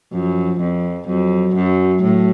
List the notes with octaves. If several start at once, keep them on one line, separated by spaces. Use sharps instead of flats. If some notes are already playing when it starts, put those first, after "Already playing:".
F#2 F3
F2
F2 F#3
F#2
A2